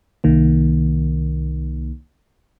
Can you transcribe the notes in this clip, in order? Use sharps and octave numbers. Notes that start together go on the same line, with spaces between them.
C2 D#3 A#3